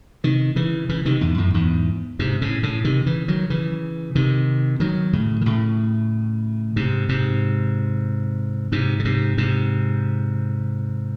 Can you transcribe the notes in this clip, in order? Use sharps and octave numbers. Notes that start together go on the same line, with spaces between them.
C3 D#3
C#3 E3
C#3 E3
C3 D#3
E2 G#2
F#2 A2
E2 G#2
G#2 C3
A2 C#3
A2 C#3
C3 D#3
C#3 E3
D#3 F#3
C#3 E3
C3 D#3
D#3 F#3
A2 C#3
D#3
A2 C#3
G#2 C3
G#2 C3
G#2 C3
C#3
G#2 C3
G#2 C3